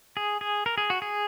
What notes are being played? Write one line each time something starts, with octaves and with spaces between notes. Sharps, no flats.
G#4
G#4
A#4
G#4
F#4
G#4